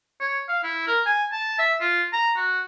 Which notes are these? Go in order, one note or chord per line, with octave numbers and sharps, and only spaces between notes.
C#5
F5
E4
A#4
G#5
A5
E5
F4
A#5
F#4